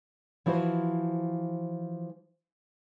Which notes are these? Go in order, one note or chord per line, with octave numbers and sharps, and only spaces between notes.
E3 F3 E4 F#4 C5